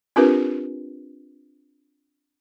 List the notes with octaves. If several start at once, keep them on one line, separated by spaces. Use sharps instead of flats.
C4 D4 F4 G4 A#4 B4